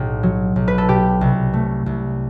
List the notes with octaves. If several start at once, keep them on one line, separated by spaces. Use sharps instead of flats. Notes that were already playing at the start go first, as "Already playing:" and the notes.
Already playing: B1 A2 G4
F#3
B1
B4
A4
B2 G4
C2
A3
C2